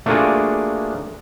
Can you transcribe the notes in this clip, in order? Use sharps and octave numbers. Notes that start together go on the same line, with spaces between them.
A3 A#3 D4 F4 F#4 G#4